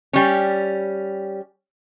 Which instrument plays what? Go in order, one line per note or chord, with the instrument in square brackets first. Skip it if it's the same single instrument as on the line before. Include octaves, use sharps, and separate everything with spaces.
[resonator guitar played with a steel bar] G3 C#4